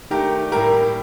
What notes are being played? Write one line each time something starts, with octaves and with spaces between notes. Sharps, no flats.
D#3 A3 D4 G4 A#4
A2 G3 A#3 G4 A#4